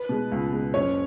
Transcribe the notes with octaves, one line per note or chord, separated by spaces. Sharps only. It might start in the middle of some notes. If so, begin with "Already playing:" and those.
Already playing: B4
B2 G#3
C#2
B2 G#3
F#1 C#4 C#5